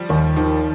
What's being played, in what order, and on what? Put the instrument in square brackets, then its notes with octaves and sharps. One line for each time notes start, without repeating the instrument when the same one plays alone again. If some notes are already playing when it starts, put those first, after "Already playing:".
Already playing: [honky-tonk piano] F3 G3
[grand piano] D#2 [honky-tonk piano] D#3
[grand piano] D#3 [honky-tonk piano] F3